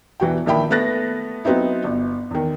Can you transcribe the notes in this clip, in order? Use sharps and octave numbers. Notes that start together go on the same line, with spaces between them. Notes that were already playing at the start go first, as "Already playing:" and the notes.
E1 E3 F#4 G5
A#1 D#3 E4 G5 B5
A3 B3 B4 F#6 A6 A#6
F#3 B3 C4 D#4 E4
G1
E2 D#3